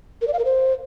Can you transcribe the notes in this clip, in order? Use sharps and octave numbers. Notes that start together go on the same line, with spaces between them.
A#4
D5
F5
A#4
C5